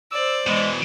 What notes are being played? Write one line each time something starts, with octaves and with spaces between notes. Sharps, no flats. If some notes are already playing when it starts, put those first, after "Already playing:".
C5 D5 E6
B2 E3 G#3